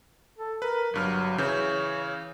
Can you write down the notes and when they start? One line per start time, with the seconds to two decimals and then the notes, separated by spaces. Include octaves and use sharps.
0.39 A4
0.62 A#4 B4
0.94 G1 G2 F#3 F6
1.38 C#3 E3 C#5 G6